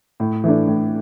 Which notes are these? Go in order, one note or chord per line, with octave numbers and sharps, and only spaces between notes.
A2
E3 A3 D4
A2